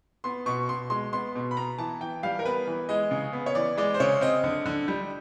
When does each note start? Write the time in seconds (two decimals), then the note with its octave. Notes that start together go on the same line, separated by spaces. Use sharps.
0.24 B3 C6
0.46 B2 C#6
0.69 B2 C6
0.90 G#3 C6
1.13 B3 C6
1.35 B2
1.51 B5
1.57 B3 A#5
1.78 E3 A5
2.00 E3 G5
2.23 G3 F5
2.39 A#4
2.45 B3 B4
2.67 E3
2.89 G#3 D#5
3.11 C#3
3.33 B3
3.46 C#5
3.55 E3 D5
3.77 G#3 D5
3.94 C5
4.00 C#3 C#5
4.21 C4 D#5
4.43 D3
4.66 D3
4.88 G3